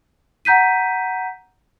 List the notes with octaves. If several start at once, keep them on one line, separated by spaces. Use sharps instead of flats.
F#5 A#5 G6 B6 D#7